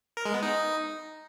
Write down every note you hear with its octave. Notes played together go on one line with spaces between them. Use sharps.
A#4
G#3
B3
D#4